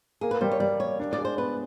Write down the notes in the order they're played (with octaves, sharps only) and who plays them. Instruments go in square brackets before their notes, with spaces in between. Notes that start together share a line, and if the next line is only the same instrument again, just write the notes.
[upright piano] A#3 [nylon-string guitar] G#4
[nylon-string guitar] B4
[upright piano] G3 [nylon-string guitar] C5
[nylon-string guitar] C#5
[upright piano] G3 [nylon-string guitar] D5
[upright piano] A#3 [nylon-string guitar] C#5
[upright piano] D4
[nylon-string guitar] D5
[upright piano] G#3
[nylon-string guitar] C5
[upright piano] B3 [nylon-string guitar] B4